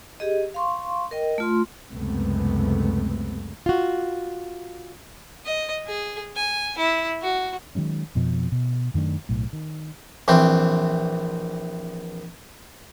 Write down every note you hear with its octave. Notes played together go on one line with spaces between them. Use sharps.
G4 G#4 D#5
F5 C6 C#6
A#4 D#5 G5
A3 F4 C6
C#2 F#2 C3 G#3 A3 B3
F4 F#4
D#5
G#4
G#5
E4
F#4
D#3 F#3 G#3 C#4
F2 B2 F3
B2
F#2 D#3 A3 D4
B1 A2
D#3
A#1 E3 C4